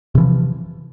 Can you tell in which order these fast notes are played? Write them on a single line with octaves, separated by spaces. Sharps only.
C3 E3 F3